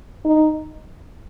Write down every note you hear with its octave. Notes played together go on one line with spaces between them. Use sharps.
D#4